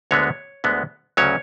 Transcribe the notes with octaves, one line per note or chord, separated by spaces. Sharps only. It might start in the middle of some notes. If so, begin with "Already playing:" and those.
D2 D3 G#3 B3 C#5
D2 D3 G#3 B3
D2 C#3 F#3 C#4 C#5